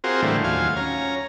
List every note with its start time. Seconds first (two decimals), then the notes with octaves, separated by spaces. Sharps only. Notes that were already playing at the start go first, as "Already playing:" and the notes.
0.04 C4 F4 F#4 G#4 A#4 C5
0.22 A2 D3 E3 G3 A3
0.44 D#2 F#3 F4 F5 G#5
0.76 C#4 A#5